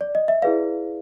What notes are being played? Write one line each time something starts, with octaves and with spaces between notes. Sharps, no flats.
D5
D#5
E5
E4 G#4 B4 D5 F5